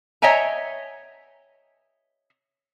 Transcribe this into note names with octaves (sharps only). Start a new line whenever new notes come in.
C#5 D#5 E5 G5 G#5 A#5